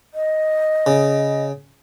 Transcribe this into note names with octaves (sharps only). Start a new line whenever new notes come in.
D#5
C#3